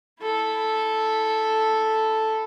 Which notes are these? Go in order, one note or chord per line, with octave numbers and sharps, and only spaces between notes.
E4 A4